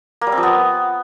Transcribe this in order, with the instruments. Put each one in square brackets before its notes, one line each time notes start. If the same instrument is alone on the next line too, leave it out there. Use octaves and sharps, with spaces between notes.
[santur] A#3
G3
C4
F3
B3